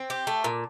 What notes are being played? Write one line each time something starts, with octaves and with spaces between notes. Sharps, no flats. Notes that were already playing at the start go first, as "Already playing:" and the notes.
Already playing: C4
G4
A3
A#2